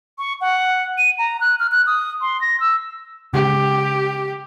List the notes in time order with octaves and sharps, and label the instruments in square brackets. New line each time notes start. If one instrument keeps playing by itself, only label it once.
[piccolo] C#6
F#5
D#7
A#5
F#6
F6
F#6
D#6
C6
A#6
E6
[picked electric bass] C#3 G#3 [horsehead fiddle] G4